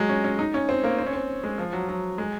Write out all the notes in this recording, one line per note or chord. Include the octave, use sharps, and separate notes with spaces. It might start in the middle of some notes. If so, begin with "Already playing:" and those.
Already playing: F#3 G#3
C#4
C#4
D#4
C#4
C4
A#3
C4
C#4
C4
G#3
F3
F#3
F#3
G#3